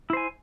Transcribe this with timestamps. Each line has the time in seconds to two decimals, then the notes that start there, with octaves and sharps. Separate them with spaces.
0.10 E4
0.13 C5
0.17 G#5